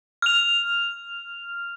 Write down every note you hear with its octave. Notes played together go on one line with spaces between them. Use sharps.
F6 F7